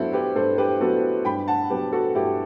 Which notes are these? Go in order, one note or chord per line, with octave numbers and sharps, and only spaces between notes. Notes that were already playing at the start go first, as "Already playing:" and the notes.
Already playing: G2 F#3 B3 E4 F#4 A4 C5
G4 B4
G2 A4 C5
G4 B4
F#3 B3 F#4 A4
G2 G5 B5
F#5 A5
F#3 B3 G4 B4
F#4 A4
G2 E4 G4